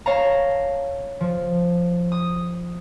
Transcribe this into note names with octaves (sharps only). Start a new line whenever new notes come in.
C#5 F5 A5 A#5
F3
D#6